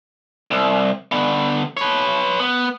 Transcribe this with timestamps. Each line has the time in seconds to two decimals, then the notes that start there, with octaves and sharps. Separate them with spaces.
0.51 C2
1.12 D3 B3
1.77 B4 C#5
2.40 B3